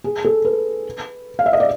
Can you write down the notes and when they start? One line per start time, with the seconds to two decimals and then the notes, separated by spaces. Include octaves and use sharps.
0.04 G#4
0.25 A4
0.45 B4
1.39 F5
1.46 E5
1.53 D#5
1.60 D5